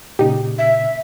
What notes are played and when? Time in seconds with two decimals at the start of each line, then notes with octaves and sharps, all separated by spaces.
0.19 A#2 C#3 D#4 G4
0.58 E5